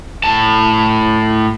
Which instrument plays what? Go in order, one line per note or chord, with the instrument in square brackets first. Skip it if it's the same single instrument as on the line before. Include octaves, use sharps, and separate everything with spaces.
[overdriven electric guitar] A2 A5